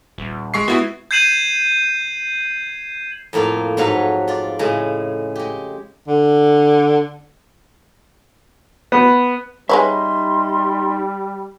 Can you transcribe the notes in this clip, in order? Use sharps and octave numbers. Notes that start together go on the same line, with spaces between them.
D#1
G#3 C#6 C7
B3 E4 F#4
G6 G#6 C7 D#7 E7 F#7
F2 A2 A#3 F4 F5
F2 G#2 F#3 B4 C#5 F5
F4 D5
A2 C#3 G#3
G#3 G4
D3
B3
G3 G#3 D#4 B4 C#5 D#5 E5 C6